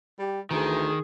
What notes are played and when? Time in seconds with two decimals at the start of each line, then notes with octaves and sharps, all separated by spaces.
0.19 G3 G4
0.51 D2 D#3 E3 G#4